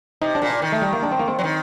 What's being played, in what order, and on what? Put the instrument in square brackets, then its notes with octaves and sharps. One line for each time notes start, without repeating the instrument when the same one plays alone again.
[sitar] C3 [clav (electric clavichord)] D#4
[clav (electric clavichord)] D4
[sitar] A#2
D#3
[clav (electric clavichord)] A3
G3
A#3
D4
C4
A#3
C4
[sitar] F#3
D#3